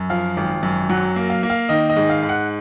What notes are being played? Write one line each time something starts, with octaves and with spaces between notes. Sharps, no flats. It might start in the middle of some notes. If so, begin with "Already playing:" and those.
Already playing: F#2
F3 F5
G#1
F#2
F#3 F#5
A#3
F5
A#3
F5
D#3 D#5
D#5
G#2
F5
G#2
F#5